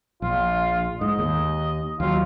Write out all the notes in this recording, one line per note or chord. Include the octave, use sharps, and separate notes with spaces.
A#1 F4
G#2 D#5
D#2
D#2 F#3 F4